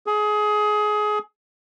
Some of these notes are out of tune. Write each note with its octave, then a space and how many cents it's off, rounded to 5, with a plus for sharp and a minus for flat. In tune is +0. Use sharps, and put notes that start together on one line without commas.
G#4 +20